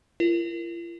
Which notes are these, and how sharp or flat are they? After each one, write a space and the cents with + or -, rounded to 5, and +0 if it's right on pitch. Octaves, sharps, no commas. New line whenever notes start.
F4 -45 A#4 +0